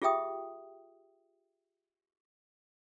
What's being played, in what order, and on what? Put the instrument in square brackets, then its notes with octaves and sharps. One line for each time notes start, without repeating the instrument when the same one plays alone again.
[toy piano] F4 G4 G#4 E5 G5 D#6